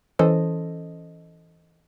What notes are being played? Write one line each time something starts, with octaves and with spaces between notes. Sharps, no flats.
E3 C#4 A4 C5 D#5